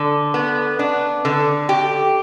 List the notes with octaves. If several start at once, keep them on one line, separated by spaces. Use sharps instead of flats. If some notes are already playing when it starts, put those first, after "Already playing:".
Already playing: D3
B3
D4
D3
G4